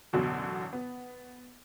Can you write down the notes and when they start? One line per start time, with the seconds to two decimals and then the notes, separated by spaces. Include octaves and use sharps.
0.13 A1 F#2 B2 D3 F#4
0.73 B3